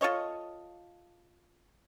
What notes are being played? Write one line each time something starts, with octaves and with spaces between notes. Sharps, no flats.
F4 A4 C#5 D#5